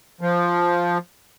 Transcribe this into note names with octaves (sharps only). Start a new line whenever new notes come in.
F3